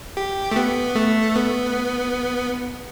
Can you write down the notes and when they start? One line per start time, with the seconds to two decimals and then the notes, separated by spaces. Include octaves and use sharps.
0.17 G4
0.51 A3
0.56 B3
0.95 A3
1.36 B3